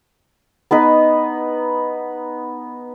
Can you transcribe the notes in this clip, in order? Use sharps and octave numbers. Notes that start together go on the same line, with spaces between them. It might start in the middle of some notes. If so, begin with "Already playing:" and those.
B3 D#4 B4